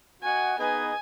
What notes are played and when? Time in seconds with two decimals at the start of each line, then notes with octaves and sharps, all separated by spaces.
0.23 F#4 D#5 F#5 G#5
0.58 B3 D#4 G#4 B4 D#5 G#5